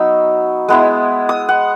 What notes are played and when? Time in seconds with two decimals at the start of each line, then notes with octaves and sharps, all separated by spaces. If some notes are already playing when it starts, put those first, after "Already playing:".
Already playing: F#3 B3 D#4 E6
0.68 G#3 B3 E4
1.29 D#6
1.49 F#5